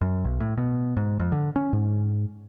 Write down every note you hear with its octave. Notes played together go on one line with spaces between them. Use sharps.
F#2
B1
A2
B2
G#2
F2
D3
C#4
G#2